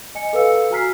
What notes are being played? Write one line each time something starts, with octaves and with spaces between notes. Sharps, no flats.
D#5 G#5 C#7
A4 B4 F5 E6 C#7
F#4 G#5 A#5 F6 B6 C7